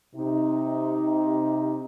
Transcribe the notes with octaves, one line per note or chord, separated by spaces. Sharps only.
C3 D#4